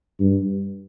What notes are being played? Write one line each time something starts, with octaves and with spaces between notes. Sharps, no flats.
G2